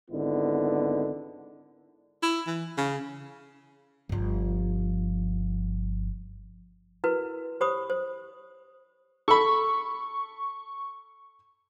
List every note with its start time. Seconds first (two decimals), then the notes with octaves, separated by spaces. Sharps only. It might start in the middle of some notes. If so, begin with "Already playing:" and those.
0.11 G#1 D3 B3 D#4 E4
2.23 E4
2.47 E3
2.77 C#3
4.09 G1 F3
7.04 E4 F#4 A#4 B4
7.61 G4 C5 C#5 B5 D#6
7.90 C5
9.28 A4 B5 C#6